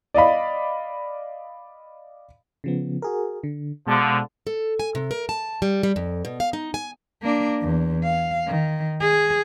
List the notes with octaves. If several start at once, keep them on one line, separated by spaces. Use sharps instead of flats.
D5 D#5 F5 B5
C#3 F3 B3
F#4 G#4 A#4
D3
B2 D3 F3 G#3 A5
A4
G#5
C3
A#4
A5
G3
G3
F2
B2
F5
D#4
G#5
A#3 D4
E2
F5
D#3
G#4